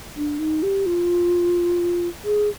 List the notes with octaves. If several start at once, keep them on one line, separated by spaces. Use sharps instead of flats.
D4
D#4
G4
F4
G#4